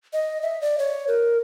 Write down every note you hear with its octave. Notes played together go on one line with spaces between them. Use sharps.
D#5
E5
D5
C#5
A#4